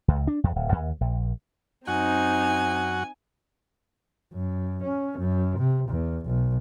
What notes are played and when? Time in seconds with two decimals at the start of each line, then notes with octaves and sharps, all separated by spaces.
0.08 C#2
0.27 D4
0.44 E2
0.56 D1
0.72 D#2
1.01 A#1
1.87 F#2 C4 D#4 F#4 F#5 G#5
4.33 F#2
4.83 C#4
5.19 F#2
5.59 C3
5.89 E2
6.26 B1